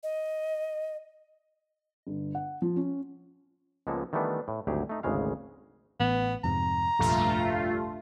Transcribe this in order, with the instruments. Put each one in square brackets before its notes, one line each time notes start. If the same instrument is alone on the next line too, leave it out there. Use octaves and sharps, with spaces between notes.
[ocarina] D#5
[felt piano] G1
F#5
F3
C#4
[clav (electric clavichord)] C#2 F3 G#3 A#3 B3 A4
D#3 E3 G3 A3 B3 D4
A2
G#1 D2 F#3 G4 G#4
A3 D#4
G#1 D2 C#3 G#3 F5
[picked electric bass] A1 [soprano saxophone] B3
[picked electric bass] F2 G#2 C3 [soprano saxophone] A#5
[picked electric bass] F1 A#1 [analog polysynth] G2 A3 F4